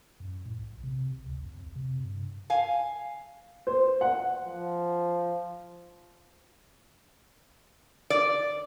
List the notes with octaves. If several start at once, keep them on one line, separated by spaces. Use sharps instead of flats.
F#2
A2
A#1
C3
G#1
D2
F2
G1
C3
G2
F5 G#5
C5
F#5
F3
D5